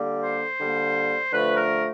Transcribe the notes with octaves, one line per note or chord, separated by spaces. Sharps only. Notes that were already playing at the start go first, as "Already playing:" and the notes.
Already playing: D3 G3 A#3
C5
D3 G3 A#3
D3 F3 A3 B4
A#4